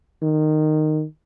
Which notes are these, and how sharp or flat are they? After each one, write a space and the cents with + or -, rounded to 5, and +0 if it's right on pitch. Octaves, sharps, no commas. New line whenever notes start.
D#3 -15